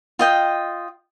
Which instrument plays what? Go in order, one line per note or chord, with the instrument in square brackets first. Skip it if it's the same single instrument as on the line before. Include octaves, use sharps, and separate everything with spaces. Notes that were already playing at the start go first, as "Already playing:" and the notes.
[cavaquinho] F4 D#5 G5